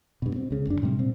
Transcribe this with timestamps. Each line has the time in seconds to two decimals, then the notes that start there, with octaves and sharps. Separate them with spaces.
0.22 G2 B2
0.36 C4
0.51 C#2 C#3
0.67 F#1 D4
0.82 A2 C3 F3 G3
0.99 A#2 C4